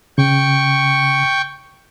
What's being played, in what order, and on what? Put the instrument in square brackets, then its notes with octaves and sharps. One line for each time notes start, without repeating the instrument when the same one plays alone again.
[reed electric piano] C#3 [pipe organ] G5 C#6